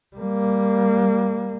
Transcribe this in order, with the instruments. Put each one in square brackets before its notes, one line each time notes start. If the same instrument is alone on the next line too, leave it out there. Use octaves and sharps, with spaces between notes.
[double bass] G3 A#3